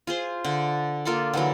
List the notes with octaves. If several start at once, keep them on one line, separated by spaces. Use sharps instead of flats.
F4 G#4 C5
D3
A#3 F4 A4 D5
D3 E3 F#3